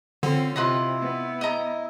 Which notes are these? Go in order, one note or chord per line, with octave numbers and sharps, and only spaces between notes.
D3 C4 C#4 F4
C3 E4 F4 B4 D#5
B3
D#5 A#5